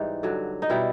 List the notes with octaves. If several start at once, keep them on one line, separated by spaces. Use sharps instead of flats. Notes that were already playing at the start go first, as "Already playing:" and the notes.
Already playing: G#2 E3 G3 D#4
G2 D3 F#3
D#4
B2 G3 E4